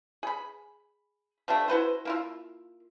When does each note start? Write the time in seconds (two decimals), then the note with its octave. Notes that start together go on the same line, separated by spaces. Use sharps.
0.23 G#4 B5
1.48 F3 G3 A3 D4
1.68 E4 F#4 B4 C5
2.05 A#3 E4 F4